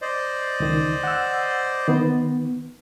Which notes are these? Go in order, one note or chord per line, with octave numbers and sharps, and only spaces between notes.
C5 D5 D#5
C#2 D#3
F#5 E6
D#3 B3